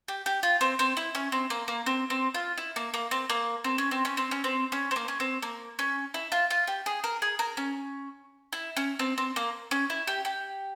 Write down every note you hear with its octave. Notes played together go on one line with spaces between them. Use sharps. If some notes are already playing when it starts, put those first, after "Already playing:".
G4
G4
F4
C4
C4
E4
C#4
C4
A#3
A#3
C4
C4
F4
E4
A#3
A#3
C4
A#3
C4
C#4
C4
C#4
C4
C#4
C4
C#4
C4
A#3
C#4
C4
A#3
C#4
E4
F4
F4
G4
G#4
A#4
G#4
A#4
C#4
E4
C#4
C4
C4
A#3
C#4
E4
G4
G4